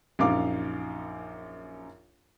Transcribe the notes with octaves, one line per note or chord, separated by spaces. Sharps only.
A#1 F#2 D#4 F5 D6